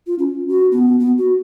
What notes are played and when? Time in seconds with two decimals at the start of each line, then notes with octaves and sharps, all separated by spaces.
0.07 F4
0.19 C#4
0.48 F#4
0.72 B3
1.00 B3
1.18 F#4